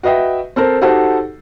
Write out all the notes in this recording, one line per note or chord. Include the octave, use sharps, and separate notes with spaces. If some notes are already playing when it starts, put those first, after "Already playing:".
F#4 B4 D#5 E5 G5
C4 A4 A#4 C5
D#4 F#4 G4 A4 C5 F#5